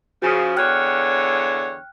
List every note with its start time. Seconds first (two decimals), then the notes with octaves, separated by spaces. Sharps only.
0.22 C#3 F3 F#4
0.57 E2 D3 C#5 G5 F6 F#6